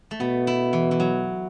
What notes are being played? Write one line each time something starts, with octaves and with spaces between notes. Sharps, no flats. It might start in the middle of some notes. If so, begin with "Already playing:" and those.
A3
B2 B3
E4
E3
E3
F#3